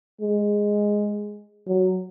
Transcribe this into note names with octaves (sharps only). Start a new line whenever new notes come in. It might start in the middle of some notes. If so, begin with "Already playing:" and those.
G#3
F#3